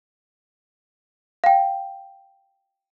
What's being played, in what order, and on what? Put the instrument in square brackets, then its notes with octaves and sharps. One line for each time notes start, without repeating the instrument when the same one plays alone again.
[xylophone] F5 G5